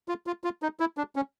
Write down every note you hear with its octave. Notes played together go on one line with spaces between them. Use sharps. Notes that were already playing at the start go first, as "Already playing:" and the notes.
F4
F4
F4
D#4
E4
D4
C#4